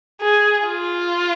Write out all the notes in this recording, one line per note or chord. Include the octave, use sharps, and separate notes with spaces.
G#4
F4